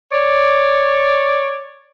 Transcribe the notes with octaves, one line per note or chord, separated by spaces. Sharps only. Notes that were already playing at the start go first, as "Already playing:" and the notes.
C#5 D5